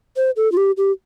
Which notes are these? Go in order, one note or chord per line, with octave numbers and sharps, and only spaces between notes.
C5
A4
F4
G4
G4